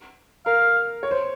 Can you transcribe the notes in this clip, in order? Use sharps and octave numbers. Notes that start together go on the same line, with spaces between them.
A#4 F5
C#5
C5